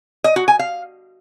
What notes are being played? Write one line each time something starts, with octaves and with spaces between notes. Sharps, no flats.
D#5
F#4
G#5
F5